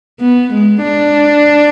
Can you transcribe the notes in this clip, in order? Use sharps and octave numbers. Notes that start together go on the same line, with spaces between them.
B3
G#3
D4